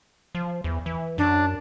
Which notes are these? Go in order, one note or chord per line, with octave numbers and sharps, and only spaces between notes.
F3
E2
E3
F#2 D4